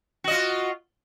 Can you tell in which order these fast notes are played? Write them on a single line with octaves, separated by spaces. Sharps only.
F#4 D#5 F4